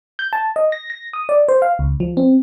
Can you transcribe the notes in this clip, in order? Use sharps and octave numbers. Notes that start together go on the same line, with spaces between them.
G6
A5
D#5
A#6
A#6
D#6
D5
C5
F5
C#2
F3
C4